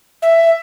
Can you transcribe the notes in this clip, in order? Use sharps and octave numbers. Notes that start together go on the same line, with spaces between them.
E5